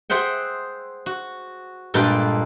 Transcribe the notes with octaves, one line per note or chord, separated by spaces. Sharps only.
G#4 C5 E5 F#5 G5
F#4
G2 A#2 G#3 A4 B4 G5